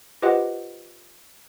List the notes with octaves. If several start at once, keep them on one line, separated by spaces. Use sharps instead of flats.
F4 G4 B4 C5 D#5 F#5